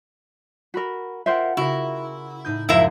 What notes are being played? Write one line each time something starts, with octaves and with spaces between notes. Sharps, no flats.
F#4 A#4 B5 B6
F4 A#4 C5 E5 F#5 G5
C#3 E4 F#4 A#4
A2 D#4 G6
C#2 F#2 F3 E4 A#4 E5 F5